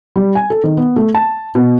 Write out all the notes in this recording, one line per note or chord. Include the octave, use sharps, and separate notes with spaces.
G3
G#5
A4
D#3
B3
A3
A5
B2